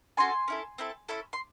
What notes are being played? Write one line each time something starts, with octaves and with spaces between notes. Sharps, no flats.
C#4 F#4 A4 G#5 C6
C#4 E4 A4
C4 E4 A4
C#4 E4 A4
C6